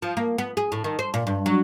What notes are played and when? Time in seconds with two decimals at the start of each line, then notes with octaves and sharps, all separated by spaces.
0.02 F3
0.17 A#3
0.38 B3
0.57 G#4
0.72 A2
0.84 D#3
0.99 C5
1.14 A#2
1.27 G2
1.46 F#3